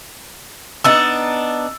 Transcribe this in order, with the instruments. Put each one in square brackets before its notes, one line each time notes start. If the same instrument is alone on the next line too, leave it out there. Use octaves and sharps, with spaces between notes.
[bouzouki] B3 D4 D#4 [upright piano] E6 A6